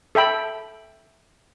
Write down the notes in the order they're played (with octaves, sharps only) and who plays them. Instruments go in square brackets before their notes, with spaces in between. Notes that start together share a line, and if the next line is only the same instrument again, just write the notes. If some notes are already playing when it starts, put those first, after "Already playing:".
[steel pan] A4 E5 G5 B5